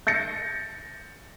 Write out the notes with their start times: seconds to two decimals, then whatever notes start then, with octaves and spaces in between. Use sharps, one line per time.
0.07 G6 A6 A#6 C#7